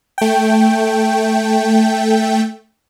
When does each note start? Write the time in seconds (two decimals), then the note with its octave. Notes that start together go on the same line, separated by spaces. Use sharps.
0.18 A3 G5